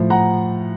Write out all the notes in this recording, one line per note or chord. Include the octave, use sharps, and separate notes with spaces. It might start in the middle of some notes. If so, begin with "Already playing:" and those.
Already playing: A2 F3
F#5 A#5